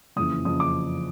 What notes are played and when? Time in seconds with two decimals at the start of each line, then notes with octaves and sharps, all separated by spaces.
0.16 F#1 F2 C#3 E3 D#6
0.45 F#1 F2 C#3 E3 D#6
0.60 D6